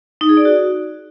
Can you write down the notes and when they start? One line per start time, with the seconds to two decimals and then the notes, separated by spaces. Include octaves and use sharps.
0.21 D#4
0.29 G#4
0.37 D5
0.45 F#4